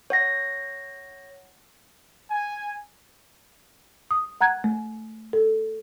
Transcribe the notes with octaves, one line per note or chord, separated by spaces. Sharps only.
C#5 F#5 A#6
G#5
D#6
F#5 A#5 F#6 G#6
A3
A4